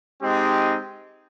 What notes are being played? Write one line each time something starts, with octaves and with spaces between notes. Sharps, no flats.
G#3 C4 D#4 G4 D#6